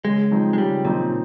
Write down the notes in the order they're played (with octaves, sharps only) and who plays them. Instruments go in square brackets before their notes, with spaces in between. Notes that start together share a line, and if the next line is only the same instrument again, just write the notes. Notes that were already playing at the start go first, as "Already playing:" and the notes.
[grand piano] C#3 [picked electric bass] G#3
[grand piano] F3 C4 D#4
[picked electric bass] G#3
[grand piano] C#3 [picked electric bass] G3
[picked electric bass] A#2 [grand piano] F3 C4 D#4